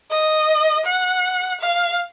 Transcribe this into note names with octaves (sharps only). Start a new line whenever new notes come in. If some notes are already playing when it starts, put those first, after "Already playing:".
D#5
F#5
F5